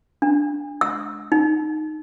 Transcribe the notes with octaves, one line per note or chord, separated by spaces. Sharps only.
D4
E6
D#4